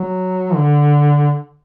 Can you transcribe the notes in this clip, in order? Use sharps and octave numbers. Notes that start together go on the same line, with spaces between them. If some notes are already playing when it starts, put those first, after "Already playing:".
Already playing: F#3
D3